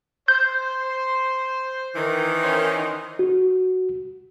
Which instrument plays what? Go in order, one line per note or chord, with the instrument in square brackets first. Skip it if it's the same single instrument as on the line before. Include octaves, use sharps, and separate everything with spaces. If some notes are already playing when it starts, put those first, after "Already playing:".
[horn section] C5 [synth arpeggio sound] G6
[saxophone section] D#3 E3
[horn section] C#4 C5
[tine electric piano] F#4